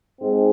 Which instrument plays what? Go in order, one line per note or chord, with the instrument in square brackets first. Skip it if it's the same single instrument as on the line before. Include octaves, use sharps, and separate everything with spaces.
[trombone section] G#2 G#3 C4